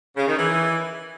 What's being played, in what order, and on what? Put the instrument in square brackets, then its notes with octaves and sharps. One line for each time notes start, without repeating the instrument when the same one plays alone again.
[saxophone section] C#3
D#3
E3